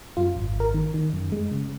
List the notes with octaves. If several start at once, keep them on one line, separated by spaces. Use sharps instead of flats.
F#2 F4
G#1
G#1
A#4
D#3
D#3
F#2
G#3
C#3